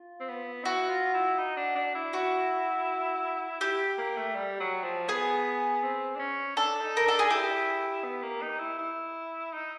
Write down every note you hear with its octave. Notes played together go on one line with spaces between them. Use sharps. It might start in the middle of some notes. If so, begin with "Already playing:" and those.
Already playing: F4
C4
B3
E4 F#4
F4
E4
D#4
D4
D4
E4
F#4
E4 G4
A#3
A3
G3
F#3
F3
B3 G#4
C4
D4
C#4
D4 A4
D#4
A#4
D4 A4
G#4
E4 G4
B3
A#3
D#4
E4
E4
D#4